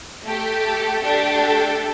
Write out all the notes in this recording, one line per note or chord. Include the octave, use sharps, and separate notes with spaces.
A3 G4
A4
A3 D4 G4